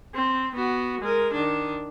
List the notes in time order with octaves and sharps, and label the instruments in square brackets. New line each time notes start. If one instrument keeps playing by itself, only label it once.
[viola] C4
B3 F#4
G#3 A#4
D#3 D4